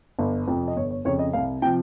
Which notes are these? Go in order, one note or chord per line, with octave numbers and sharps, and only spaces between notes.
G1
F2 C3 F3
D#5
G1 C#5
C#5
F2 C#3 C#5
D#5
C2 F5
C3 F3 G5